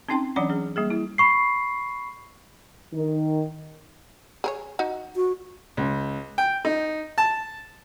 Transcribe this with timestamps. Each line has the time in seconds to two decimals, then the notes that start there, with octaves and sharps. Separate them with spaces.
0.09 C4 C#4 D#4 G5 A5 C6
0.36 E3 F#3 C#4 D4 D5 F#5
0.50 C#4 G#4
0.76 G3 A#3 G#4
0.90 E4
1.18 B5 C#6 C7
2.93 D#3
4.44 G#4 A#4 C#5
4.79 D#4 F#4
5.16 F#4
5.77 C#2
6.38 G5
6.65 D#4
7.18 A5